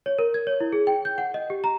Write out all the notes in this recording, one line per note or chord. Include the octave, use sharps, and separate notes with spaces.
C#5
A#4
G#6
C#5
E4
G#4
G5
G6
F#5
D#5
G4
A#5